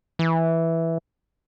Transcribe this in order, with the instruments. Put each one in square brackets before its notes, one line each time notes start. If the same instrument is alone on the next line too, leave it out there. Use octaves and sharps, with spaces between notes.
[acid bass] E3